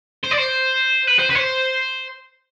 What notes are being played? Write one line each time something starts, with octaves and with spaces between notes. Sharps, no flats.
C5
D5
C5
B4
C5
B4
C5